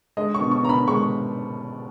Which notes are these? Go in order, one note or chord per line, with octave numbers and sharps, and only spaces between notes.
G#3 D#5
C#6
B2
C#6
B2 A#5
B5
G#3 C#6